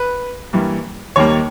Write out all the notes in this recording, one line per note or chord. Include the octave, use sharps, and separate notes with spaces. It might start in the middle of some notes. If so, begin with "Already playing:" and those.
Already playing: B4
G2 E3 G3 A#3
D#2 D#3 G3 A#3 C#5